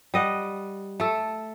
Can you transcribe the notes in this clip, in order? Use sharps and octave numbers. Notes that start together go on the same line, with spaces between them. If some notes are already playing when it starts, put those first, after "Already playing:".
G3 D#5 F#5
A3 A4